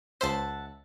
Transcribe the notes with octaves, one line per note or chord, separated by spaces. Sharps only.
C#2 C5 E5 F#5 A5